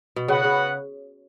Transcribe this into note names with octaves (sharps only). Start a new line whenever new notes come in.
B2
C#3 B3 F#4 B4 F#5
C#3